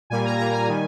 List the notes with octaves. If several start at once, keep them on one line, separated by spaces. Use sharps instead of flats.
A#2 G3 A#3 G#5
A#5
A#2 G3 A#3 A#5
G#5
D#3 G3